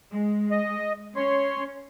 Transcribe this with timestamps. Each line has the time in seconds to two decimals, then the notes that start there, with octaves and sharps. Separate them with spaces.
0.12 G#3
0.51 D#5
1.16 C#4 C#5 C6